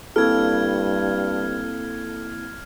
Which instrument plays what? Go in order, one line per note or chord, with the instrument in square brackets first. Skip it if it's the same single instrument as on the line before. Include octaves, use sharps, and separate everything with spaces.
[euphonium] G2 [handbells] A#3 C4 E4 [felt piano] A4 [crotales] F6 G#6